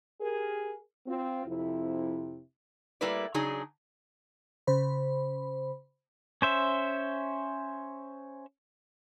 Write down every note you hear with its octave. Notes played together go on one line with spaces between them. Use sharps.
G4 G#4 A#4
C4 F4
F2 C3 E4
G3 A3 A#3 E4 B4 D5
C#3 F#3 D4 D#4 G#4
C#3 C5 B5
C#4 C5 E5